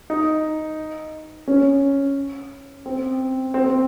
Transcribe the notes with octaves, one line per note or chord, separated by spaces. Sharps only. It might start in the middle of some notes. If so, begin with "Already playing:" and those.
D#4
C#4
C4
C4
C4